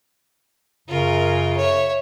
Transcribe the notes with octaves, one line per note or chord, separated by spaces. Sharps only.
F#2 C#3 F4 A#4
C#5 E5